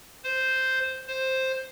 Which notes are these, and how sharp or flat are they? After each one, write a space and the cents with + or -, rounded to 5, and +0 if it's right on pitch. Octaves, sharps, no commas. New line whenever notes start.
C5 -5
C5 +5